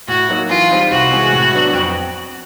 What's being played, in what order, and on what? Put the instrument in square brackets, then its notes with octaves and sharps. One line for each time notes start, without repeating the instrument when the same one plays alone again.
[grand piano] A2 [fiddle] F#4
[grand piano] F#3 A#3 D#4
[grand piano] E3 [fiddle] F4
[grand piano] G3 C4 D#4
[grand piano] C2 [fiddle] F#4
[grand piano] C3 E3 G#3
A2
F#3 B3 D4
F2